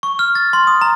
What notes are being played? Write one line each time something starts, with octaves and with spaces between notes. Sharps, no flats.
C#6
F6
A6
C6
D#6
A#5